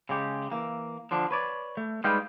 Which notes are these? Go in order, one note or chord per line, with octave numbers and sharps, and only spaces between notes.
C#3 G#3 G4
E3 A#3
D3 F3 D4
B4 C#5 D5
A3
G3 G#3 D#4 B4 F5 G5